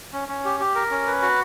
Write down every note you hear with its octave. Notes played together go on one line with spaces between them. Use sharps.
C#4
C#4
G4
G4
A#4
C#4
B4
F#4